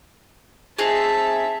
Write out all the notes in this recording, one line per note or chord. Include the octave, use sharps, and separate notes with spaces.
C4 D#4 G#4 E5 A5